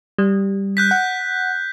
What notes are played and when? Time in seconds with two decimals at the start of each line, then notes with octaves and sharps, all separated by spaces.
0.18 G3
0.77 F#6 G6 B6
0.91 F#5